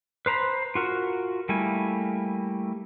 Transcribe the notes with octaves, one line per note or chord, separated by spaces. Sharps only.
B4 C5 A#5 B5
F4 F#4 A#4
G3 A3 A#3 E4 G#5